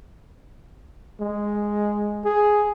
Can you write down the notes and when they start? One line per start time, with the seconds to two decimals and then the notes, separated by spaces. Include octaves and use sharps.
1.20 G#3
2.25 G#4